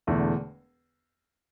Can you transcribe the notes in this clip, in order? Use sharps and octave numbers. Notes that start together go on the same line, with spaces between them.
E1 E2 D3 A3